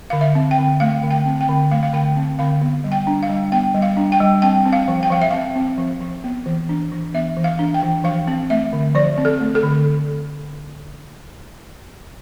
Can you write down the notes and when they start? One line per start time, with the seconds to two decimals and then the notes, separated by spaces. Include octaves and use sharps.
0.10 D3 F5
0.21 E5
0.35 C4
0.51 G5
0.58 D3
0.80 A3 F5
1.03 D3
1.10 G5
1.26 C4
1.41 G5
1.49 D3
1.71 A3 F5
1.83 F5
1.93 D3 G5
2.16 C4
2.39 D3 F5
2.62 B3
2.84 G3
2.92 G5
3.07 D4
3.23 F5
3.30 G3
3.52 B3 G5
3.74 G3
3.82 F5
3.97 D4
4.12 G5
4.20 G3
4.42 C4 G5
4.65 C4
4.73 F5
4.88 F3
5.03 G5
5.10 F3 F5
5.22 E5
5.31 C4 F5
5.56 C4
5.78 F3
6.01 F3
6.24 B3
6.46 E3
6.69 D4
6.92 E3
7.14 B3 E5
7.37 E3
7.44 F5
7.59 D4
7.74 G5
7.82 E3
8.04 F3 F5
8.28 C4
8.50 A3 E5
8.73 D3
8.95 F3 D5
9.18 C4
9.25 A4
9.41 A3
9.55 A4
9.63 D3